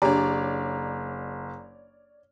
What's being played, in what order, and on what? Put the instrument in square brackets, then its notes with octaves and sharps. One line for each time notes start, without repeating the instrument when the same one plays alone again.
[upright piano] F#1 [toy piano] D4 G4 [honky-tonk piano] C#5 D5 [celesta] A#5